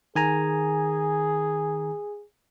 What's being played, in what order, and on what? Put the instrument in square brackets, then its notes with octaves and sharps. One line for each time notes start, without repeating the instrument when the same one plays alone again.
[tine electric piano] D#3 G#5 A#5 [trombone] G#4